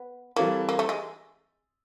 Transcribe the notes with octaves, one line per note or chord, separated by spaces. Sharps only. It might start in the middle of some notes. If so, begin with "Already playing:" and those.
Already playing: B3
E3 G3 A#3 C4 E4 A4
A#3
A3
G#3